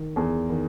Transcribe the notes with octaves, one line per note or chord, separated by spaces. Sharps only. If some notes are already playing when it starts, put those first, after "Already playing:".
Already playing: D#3
E2 G#4
D#3